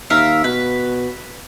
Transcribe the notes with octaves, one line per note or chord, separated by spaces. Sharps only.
D#2 A#4 E5 F5
B2 B4